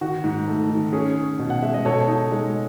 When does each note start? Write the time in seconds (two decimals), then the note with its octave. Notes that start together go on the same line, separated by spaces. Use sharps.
0.01 D#3 F#4
0.24 G#2
0.48 A3
0.70 D#3
0.93 C#4 G#4
1.16 C#4
1.39 B2
1.50 F#5
1.62 G#3 E5
1.74 D#5
1.85 B2 A4 C#5
2.08 D#4
2.32 G#3